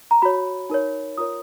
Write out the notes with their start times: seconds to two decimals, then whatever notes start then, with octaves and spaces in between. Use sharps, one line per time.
0.11 A#5
0.22 F#4 C#5 B5
0.70 D#4 A#4 C#5
1.17 F4 A#4 C#5 D#6